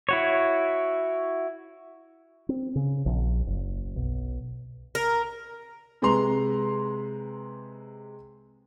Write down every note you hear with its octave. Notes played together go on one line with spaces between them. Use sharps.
E4 F#4 C#5
C4
C#3
A#1
F#1
B1
A#4
C3 G#3 B4 A#5 C6 F7